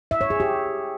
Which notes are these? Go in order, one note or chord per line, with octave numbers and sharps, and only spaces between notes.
E5
C#5
G#4
G4